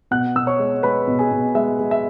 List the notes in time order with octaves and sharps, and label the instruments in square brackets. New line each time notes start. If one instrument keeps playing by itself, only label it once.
[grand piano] B2 F#5 F#6
B2 E6
C#5 C#6
G#3
G#3 B4 B5
B2
G#4 G#5
B2
G#3 E5
G#3
E5